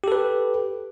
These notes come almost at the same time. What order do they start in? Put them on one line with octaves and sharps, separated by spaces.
G4 A4 B4